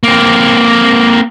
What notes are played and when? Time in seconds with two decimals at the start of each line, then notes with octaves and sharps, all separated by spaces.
0.03 A#3 C4